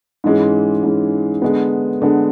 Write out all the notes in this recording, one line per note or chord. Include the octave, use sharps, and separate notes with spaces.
G#2 E3 G#3 C#4
G#2 E3 G#3 C#4
D3 G#3 B3
D3 G#3 B3